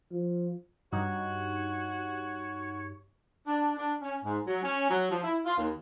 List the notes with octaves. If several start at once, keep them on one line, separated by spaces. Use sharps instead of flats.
F3
G2 D#4 F#4 G4 C#5
D4
D4
C#4
G#2
F#3
C#4
F#3
F3
E4
F4
D#2